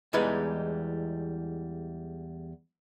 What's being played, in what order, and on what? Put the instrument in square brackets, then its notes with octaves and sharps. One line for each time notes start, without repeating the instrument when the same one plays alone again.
[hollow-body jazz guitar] E2 E3 G3 G#3 D#4 B4